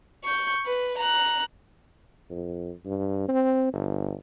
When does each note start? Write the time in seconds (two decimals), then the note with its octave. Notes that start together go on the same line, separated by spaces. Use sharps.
0.24 C#6 G6
0.66 B4
0.98 A#5 F#6
2.30 F2
2.86 G2
3.28 C4
3.73 G1